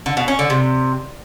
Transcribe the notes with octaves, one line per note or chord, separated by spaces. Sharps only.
D3
B2
C#4
D3
C3